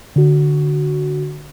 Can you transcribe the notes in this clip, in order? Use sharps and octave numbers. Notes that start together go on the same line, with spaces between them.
D3 F#4